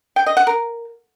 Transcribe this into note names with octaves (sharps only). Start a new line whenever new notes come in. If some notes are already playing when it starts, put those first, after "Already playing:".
G5
D#5
F#5
A#4